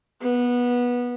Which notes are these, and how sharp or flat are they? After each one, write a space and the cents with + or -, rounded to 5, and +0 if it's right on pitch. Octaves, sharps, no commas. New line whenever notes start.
B3 -15